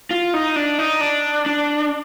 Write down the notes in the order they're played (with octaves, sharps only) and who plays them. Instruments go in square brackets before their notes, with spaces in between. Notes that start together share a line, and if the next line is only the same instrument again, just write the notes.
[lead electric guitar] F4
D#4
D4
D#4
D4
D4